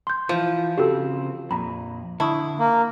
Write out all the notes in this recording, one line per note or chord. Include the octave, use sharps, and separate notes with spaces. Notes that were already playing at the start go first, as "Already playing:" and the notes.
C6 G6
E3 F3
C#3 C4 F#4 G4 A4
F2 A#2 A#5 B5
D3 E4 A5 C#6 D#6
A#3